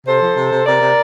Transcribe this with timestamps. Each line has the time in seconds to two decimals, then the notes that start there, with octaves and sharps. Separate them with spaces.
0.07 C3 A4 C5
0.22 F3
0.37 C3
0.52 C3
0.66 C3 A#4 D5
0.82 C3